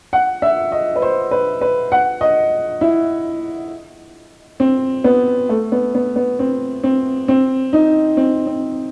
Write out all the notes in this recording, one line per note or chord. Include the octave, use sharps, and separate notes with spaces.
F#5
E5
D#5
B4
C5
B4
B4
F#5
D#5
E4
C4
B3
A3
B3
B3
B3
C4
C4
C4
D#4
C4
C4